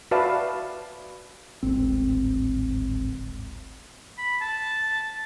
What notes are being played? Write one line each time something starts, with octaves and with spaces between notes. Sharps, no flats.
F#4 B4 D5 E5 F5 A5
D1 G#1 C4
B5
A5